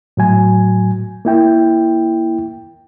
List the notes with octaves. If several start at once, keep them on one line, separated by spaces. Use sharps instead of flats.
A2 F#3 G#5
A#3 E4 G5